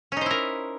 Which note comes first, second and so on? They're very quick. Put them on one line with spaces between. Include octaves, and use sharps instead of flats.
C#4 D#4 C5 E4 A#4